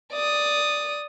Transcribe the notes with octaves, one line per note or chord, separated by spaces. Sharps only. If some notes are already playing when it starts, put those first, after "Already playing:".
D5 D#6